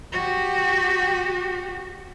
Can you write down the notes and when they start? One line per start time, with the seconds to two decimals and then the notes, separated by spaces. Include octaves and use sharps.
0.13 F#4 G4